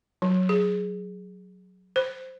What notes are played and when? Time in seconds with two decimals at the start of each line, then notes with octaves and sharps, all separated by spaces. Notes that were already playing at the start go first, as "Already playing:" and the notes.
0.22 F#3
0.49 G#4
1.96 C5